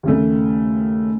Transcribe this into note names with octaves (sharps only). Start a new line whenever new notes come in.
D#2 C#3 A3